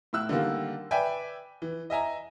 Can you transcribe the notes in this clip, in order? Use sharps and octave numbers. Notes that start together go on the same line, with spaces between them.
A2 E4 E6 F#6
D3 D#3 G3 A#3
B4 D5 E5 G5 G#5
E3
D#5 E5 G#5 A#5